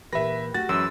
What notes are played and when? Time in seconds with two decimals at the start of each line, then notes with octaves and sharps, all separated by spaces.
0.13 A#2 E3 G4 B4 E5 A#6
0.54 A3 F#4 G4 A6
0.69 F#2 E3 G#3 C#4 B4 E6